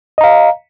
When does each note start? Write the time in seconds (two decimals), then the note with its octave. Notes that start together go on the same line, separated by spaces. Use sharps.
0.18 D#5
0.21 A#5
0.24 F5